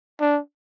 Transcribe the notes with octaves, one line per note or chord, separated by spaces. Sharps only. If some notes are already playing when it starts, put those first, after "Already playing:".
D4